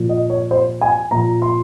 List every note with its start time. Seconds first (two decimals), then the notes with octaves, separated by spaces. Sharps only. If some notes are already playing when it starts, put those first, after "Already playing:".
Already playing: A#2 F3
0.09 D#5
0.30 C#5
0.51 C5
0.81 G#5
1.11 A#2 F3 A#5
1.42 C6